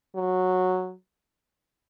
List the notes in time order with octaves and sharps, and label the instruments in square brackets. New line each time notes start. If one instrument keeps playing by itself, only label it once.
[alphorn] F#3